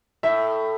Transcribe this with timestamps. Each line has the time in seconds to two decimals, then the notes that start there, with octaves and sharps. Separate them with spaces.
0.23 A2 E5